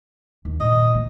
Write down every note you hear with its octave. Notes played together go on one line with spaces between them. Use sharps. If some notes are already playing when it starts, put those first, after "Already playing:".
D#2
A#2 D#3 D#5
E3 A#3